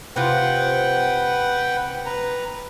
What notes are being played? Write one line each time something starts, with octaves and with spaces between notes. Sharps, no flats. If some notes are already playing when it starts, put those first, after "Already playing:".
C3 F4 B4 F#5 G5
B4 A#5